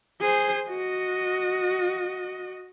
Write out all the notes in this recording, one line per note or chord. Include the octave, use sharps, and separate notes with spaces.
G#4 C5
F#4 D#5